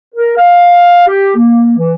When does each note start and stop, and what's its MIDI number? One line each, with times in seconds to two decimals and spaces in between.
0.15 0.36 70
0.37 1.04 77
1.07 1.33 67
1.36 1.74 58
1.78 1.95 52